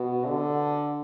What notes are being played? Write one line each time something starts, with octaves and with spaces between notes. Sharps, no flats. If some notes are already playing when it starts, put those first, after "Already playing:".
Already playing: B2
D3